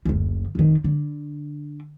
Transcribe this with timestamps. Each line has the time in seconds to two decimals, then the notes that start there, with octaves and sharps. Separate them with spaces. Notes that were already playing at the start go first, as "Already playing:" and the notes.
0.05 F#1 D2
0.55 F1 D#3
0.84 D3